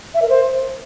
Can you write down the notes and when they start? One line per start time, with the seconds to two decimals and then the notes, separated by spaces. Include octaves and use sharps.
0.14 E5
0.22 A#4
0.30 C5